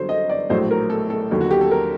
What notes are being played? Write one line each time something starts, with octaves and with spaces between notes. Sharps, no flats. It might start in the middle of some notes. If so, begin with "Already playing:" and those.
Already playing: G1 G2 D3 F#3 C5
D#5
D5
A#1 A2 F#3 C5
A#4
A4
A4
D#2 D3 F#3
F#4
G4
A4
A#4